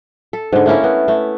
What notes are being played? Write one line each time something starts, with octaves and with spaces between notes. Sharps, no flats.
A4
G#2 D3
A3 A#3 C#4 E4
B3
A3